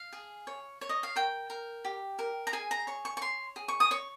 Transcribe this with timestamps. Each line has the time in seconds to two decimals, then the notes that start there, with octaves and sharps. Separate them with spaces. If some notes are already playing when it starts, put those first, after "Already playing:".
Already playing: F5
0.13 G#4
0.47 C#5
0.81 C#5
0.89 D#5
1.03 F5
1.16 A#4 G5
1.50 A#4
1.85 G4
2.19 A#4
2.47 A#5
2.53 G#4 G#5
2.71 A#5
2.87 C#5 C#6
3.05 C#6
3.17 C#6
3.21 C#5 C6
3.56 G#4
3.68 C#6
3.80 D#6
3.91 C#5 C#6